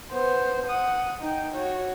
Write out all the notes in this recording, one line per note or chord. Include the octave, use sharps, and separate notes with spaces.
B3 C5
F#5 D#6
D#4 G5
F#4 C#5